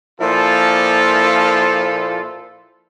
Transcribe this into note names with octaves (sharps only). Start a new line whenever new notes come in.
A#2 F3 A#3 E4 F4 A4